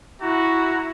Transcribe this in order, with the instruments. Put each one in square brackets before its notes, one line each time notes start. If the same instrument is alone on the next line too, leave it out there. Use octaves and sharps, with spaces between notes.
[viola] E4 [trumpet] F#4 [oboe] A#5